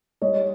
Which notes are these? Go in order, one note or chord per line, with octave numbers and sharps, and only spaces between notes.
G3 C#5 D#5